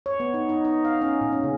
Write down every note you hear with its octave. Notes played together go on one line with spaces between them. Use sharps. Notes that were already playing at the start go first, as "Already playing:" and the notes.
C#5
B3
D#4
D#4
D#4
F5
C#4
A#2
C#4
C#3